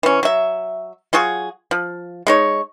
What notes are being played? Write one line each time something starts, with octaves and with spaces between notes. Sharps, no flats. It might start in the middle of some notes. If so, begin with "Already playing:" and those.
E3 C#4
F#3 E5
F#3 F4 F#4 G#4
F3
G#3 D#4 C#5